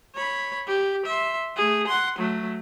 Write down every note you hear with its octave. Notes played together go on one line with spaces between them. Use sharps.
C#5 B5
G4
E5 C6
A3 G#4
F#5 C6
F#3 A3